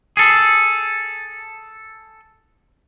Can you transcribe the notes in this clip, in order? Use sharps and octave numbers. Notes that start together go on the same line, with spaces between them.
G#4 A4